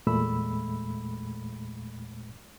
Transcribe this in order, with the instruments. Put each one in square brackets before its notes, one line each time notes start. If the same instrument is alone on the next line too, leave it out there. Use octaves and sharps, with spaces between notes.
[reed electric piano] E2 A#2 G#3 A3 B5 E6